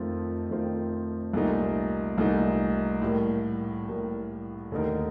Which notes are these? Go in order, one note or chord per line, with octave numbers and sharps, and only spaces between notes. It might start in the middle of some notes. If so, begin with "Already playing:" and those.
Already playing: F2 D#3 A3 C4 F4
F2 D#3 A3 C4 F4
C2 A#2 A3 D#4
C2 A#2 A3 D#4
A2 G3 A#3
A2 G3 A#3
D#2 D3 A3 D#4 A#4